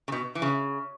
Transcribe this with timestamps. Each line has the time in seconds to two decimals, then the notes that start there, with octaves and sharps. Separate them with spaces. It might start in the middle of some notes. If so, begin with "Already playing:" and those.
0.08 C#3
0.12 B2
0.35 E3
0.42 C#3